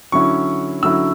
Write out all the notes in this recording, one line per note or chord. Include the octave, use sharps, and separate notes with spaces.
D3 F#3 C#4 E4 C#6
D3 F#3 C#4 E4 E6